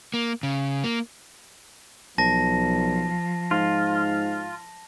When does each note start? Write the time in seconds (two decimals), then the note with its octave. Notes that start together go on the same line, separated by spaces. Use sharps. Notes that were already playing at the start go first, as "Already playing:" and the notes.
0.14 A#3
0.43 C#3
0.84 A#3
2.18 B1 F3 A5 A#6
3.51 G#2 F4